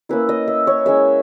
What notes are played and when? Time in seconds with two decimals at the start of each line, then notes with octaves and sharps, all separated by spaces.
0.09 A#3 C#4 E4 B4
0.29 D#5
0.48 E5
0.67 C#5
0.86 G#3 C#4 E4 E5